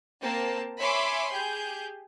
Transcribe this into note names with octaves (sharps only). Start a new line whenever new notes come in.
A#3 C4 A5
C#5 E5 G#5 B5 C6 D6
G4 G#4 G6